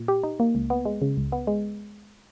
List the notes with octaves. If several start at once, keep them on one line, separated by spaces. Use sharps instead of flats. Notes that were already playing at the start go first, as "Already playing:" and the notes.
Already playing: A#2
G4
D#4
A#3
C#2
B3
G#3
C#3
C#2
B3
G#3